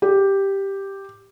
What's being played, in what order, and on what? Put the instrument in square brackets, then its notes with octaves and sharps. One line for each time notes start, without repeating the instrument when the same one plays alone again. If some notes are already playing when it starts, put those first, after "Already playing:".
[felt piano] G4